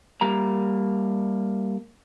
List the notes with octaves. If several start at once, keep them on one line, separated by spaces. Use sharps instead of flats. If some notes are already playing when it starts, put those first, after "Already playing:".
G3 A#3 A#5